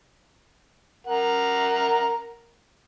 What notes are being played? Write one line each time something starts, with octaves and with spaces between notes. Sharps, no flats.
A#4 F#5